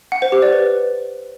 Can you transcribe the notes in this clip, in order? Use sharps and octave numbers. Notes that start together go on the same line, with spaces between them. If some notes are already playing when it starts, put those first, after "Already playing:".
F#5
C5
G4
D5
B4